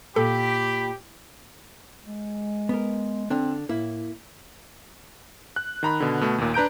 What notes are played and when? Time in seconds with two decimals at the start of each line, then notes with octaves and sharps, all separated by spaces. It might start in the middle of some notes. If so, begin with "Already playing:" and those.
0.16 A#2 G4 A4 B5
2.04 G#3
2.69 B3 A#4
3.30 D3 C4 D4
3.69 A2 A#3 E4
5.56 F#6
5.83 D#3 A#5 B5
6.00 B2 D3
6.21 B2 A3
6.38 D#2 A#2
6.54 D4 B4 A#5 G6 D7